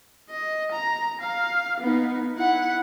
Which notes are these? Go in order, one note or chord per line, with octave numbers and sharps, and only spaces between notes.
D#5
A#5
F5
B3 D#4
E4 F#5